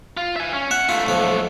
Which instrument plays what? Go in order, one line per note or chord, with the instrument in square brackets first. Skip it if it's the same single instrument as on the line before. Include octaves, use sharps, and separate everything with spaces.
[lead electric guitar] F4
E5 G#5
C#4
[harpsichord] E5 [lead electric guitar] F#5
[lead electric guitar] G#2 A3 [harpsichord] F4
[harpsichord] B1 F3